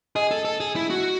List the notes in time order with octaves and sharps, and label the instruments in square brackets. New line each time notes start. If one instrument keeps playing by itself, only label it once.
[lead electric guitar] G#4 [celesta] D#5
[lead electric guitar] A4
A4
G#4
E4
F#4